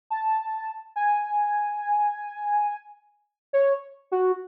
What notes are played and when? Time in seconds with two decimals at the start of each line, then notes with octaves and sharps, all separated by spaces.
0.10 A5
0.96 G#5
3.53 C#5
4.12 F#4